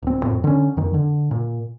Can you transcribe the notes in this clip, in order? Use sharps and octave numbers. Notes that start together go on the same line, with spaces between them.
D1 C4
F2 A2 C4
D3 C#4
F2 D#3
D3
A#2